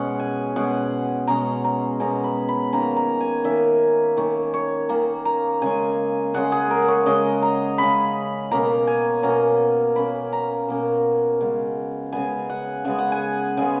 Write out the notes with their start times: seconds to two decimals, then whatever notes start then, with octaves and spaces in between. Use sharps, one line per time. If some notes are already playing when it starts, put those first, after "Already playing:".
Already playing: B2 G#3 C#4 F#5
0.20 G#5
0.56 B2 G#3 C#4 F#5
1.27 B2 G#3 C#4 A#5
1.64 A#5
2.00 B2 G#3 C#4 A#5
2.24 B5
2.49 B5
2.73 D#3 A#3 C#4 A#5
2.97 A#5
3.20 G#5
3.44 D#3 A#3 C#4 E5
4.17 D#3 A#3 C#4 C#5
4.54 C#5
4.89 D#3 A#3 C#4 A#5
5.25 A#5
5.62 C#3 G#3 C#4 G#5
6.34 C#3 G#3 C#4 F#5
6.52 G#4
6.70 A#4
6.88 C#5
7.06 C#3 G#3 C#4 D#5
7.42 A#5
7.78 C#3 G#3 C#4 B5
8.51 B2 A#3 C#4 A#5
8.87 G#5
9.23 B2 A#3 C#4 A#5
9.96 B2 A#3 C#4 B5
10.33 A#5
10.68 B2 A#3 C#4
11.41 C#3 G#3 B3
12.13 C#3 G#3 B3 G#5
12.50 F#5
12.85 C#3 G#3 B3 G#5
12.98 F#5
13.12 G#5
13.57 C#3 G#3 B3 G#5